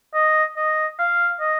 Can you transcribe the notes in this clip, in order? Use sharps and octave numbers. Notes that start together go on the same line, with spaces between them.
D#5
D#5
F5
D#5